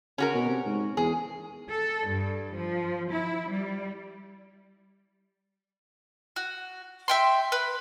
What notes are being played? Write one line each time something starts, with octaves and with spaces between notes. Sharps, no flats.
C#3 C#4 F#4 A#4
B2
C3
G#2
E2 G#4
A4
G2
F3
E4
G3
F#4
E5 G5 C6
B4